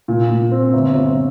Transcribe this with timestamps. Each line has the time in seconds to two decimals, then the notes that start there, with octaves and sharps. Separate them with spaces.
0.08 A#2
0.30 A#2
0.51 C4
0.74 G1
0.95 G1